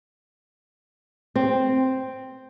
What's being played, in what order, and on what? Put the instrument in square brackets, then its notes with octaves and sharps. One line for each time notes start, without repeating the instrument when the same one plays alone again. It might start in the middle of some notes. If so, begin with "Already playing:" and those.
[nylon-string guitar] C4